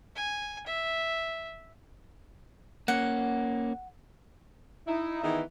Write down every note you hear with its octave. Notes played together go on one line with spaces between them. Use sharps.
G#5
E5
A#3 C#4 F#5
D#4 E4
D#3 E3 B3 G#4 D#5 E5